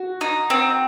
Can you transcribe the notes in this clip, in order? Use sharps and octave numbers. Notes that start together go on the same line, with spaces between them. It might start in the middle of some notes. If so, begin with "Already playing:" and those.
Already playing: F#4
D#4
C4